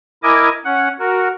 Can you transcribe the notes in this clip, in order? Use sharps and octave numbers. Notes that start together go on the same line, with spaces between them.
E4 A#4 D#5 G#5 D6
C#4 F#5
F#4 A#4